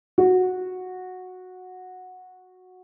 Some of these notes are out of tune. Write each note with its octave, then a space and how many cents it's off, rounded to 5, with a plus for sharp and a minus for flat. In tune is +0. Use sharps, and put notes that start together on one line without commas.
F#4 -10